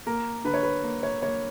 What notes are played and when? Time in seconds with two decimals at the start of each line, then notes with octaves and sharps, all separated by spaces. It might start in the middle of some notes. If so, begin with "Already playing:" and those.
0.06 A#3 A#4
0.45 D3 B4
0.54 C#5
0.63 B4
0.83 A#3
1.03 C#5
1.22 A#3 C#5